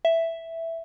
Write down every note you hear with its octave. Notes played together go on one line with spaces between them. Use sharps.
E5